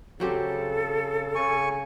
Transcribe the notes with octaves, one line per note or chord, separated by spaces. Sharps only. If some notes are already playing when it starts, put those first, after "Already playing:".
C#3 F#3 C4 G4 A4
C#3 G#5 C#6